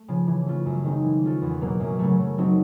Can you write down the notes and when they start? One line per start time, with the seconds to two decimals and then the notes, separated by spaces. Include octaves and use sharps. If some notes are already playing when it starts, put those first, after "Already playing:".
Already playing: A3
0.08 C#3 F3
0.27 E3
0.46 A3 C#4 F4
0.65 F#2
0.84 D#3 G#3 C4 D#4
1.04 E3
1.23 G#3 C#4 F4 A4
1.42 E2
1.61 B2 F#3 A#3
1.80 F#2
1.99 C#3 F#3 A3
2.19 C#3
2.38 F#3 A3 C4 D#4